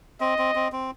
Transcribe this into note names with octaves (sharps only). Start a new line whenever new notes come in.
C4 D#5
C4
C4
C4